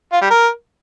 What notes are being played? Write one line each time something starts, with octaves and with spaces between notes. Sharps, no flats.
F4
G3
A#4